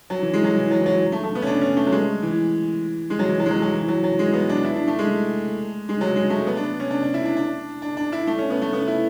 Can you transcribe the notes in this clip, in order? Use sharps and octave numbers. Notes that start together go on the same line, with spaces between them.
F#3
E3
G#3
F#3
E3
F#3
E3
F#3
A3
A3
B3
C#4
D4
C#4
A3
F#3
G#3
E3
G#3
F#3
E3
F#3
G#3
F#3
F#3
E3
F#3
F#3
G#3
B3
D4
E4
D4
A3
G#3
G#3
F#3
G#3
A3
B3
D4
C#4
D4
D4
E4
D4
D4
D4
D4
E4
A3
C#4
B3
A3
B3
E4